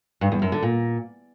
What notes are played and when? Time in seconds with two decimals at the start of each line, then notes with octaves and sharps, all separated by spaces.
0.21 G2
0.32 E2
0.42 F#2
0.52 D3
0.62 A#2